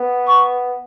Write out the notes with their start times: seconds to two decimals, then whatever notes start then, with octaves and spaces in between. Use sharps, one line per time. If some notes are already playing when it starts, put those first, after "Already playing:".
Already playing: B3
0.27 C#6